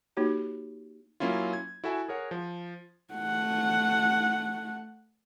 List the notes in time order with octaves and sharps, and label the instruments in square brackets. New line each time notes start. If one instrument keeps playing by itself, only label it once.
[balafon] A#3 D#4 F#4 G4 C#5
[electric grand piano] F#3 A#3 C#4 E4 F4
G#6
E4 F#4 A4 E5 G#5
G#4 A#4 C#5 F#5
F3
[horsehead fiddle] A3 F#5